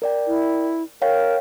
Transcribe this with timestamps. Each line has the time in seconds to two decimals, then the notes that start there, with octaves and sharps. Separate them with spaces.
0.02 A#4 D5 G5
0.27 E4
1.02 A#4 C#5 F5 G5